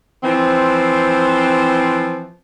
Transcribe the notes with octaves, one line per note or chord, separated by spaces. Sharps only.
E3 F3 C4